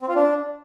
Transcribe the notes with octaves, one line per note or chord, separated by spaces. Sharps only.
C4
F4
D4